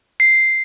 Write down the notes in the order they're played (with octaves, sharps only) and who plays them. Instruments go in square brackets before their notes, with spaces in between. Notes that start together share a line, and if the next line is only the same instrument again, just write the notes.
[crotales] C7